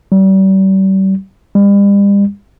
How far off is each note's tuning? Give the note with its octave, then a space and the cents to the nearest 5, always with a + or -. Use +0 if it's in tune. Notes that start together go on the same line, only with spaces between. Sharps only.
G3 -35
G3 +40